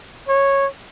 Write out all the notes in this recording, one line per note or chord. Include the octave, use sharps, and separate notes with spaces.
C#5